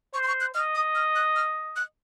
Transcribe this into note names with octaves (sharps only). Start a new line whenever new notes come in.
C5 C#6
C6
C#6
F#6
D#5 F6
D#6
F6
F#6
F6
F#6